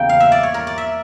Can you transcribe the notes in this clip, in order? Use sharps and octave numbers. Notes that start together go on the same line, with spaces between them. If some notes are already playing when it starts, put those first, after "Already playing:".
Already playing: E2 C#3 G3 A#3 G5
F5
E5
D5
C#5
A#4
D5
E5